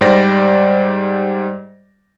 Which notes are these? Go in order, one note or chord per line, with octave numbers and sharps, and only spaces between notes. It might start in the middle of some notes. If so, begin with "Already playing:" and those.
G#2 G3 G4 C5 D5 A#6